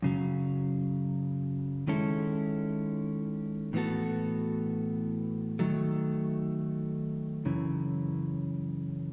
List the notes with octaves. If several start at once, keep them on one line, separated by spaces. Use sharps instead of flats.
F#2 C#3 F#3
D#3 G#3 C#4 E4 A4
A2 E3 B3 F#4 A4
D#3 F#3 A3
F#2 C#3 E3